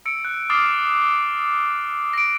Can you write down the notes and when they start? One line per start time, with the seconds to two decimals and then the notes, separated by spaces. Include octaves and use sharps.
0.05 E6 C#7 D7
0.25 F#6
0.50 D6 D#6 F6 A6 C7
2.13 A#6 D7